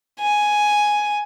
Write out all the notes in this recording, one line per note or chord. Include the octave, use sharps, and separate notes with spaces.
G#5